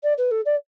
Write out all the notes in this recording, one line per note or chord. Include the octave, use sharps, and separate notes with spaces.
D5
B4
A4
D5